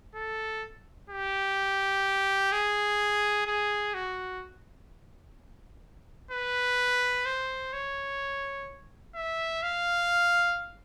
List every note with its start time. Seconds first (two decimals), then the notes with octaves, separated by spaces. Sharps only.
0.15 A4
1.10 G4
2.52 G#4
3.47 G#4
3.94 F#4
6.31 B4
7.25 C5
7.73 C#5
9.15 E5
9.63 F5